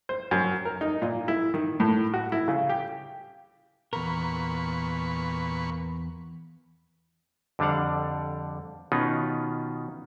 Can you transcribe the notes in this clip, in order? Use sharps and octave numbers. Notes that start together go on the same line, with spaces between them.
C5
F#2
A#4
D#4
A#2
E4
D#3
A2
F#4
E4
C#3
G4
E2 A#2 A#4 B4 C#6
F2 D3 G3 D4 F5 F#5
B2 D#3 B3 C#4 D#4 F4